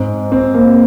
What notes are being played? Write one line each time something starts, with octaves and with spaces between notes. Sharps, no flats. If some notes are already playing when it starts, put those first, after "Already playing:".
Already playing: G#2 C4
C4
A#3